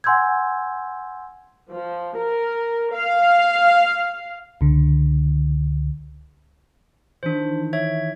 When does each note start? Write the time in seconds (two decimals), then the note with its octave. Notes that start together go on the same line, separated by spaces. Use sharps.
0.04 F#5 G#5 C6 E6 G6 G#6
1.72 F3
2.18 A#4
2.93 F5
4.61 C#2 D3
7.23 D#3 E3 D4 C5
7.73 C#5 E5 G#6